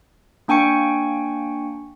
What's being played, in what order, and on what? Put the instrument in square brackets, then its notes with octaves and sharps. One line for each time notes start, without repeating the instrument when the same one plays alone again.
[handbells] A#3 D4 G5 G#5 C#6 C#7